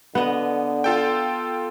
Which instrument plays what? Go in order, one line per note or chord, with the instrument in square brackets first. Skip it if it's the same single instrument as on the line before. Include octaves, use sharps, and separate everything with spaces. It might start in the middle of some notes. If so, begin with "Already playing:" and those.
[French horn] D3 [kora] B3 D#5
[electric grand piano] F4 A4 G5